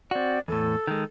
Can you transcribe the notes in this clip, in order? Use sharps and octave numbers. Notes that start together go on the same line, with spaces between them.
C4 F#4 D5
E2 A2 A4
D#3 G#3